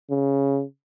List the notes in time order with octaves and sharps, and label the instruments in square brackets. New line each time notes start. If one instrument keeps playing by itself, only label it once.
[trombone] C#3